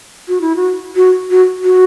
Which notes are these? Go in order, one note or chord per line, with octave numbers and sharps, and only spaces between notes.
F#4
E4
F#4
F#4
F#4
F#4